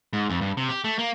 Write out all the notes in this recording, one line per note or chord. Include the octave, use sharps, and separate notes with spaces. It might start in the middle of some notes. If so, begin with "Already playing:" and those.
G#2
F2
G2
C3
G4
A3
A#3